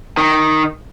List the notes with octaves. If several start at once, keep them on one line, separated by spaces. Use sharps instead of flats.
D#3